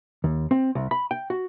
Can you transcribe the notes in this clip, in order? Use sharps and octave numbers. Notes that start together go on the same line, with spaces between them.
D#2
C4
C2
B5
G5
F#4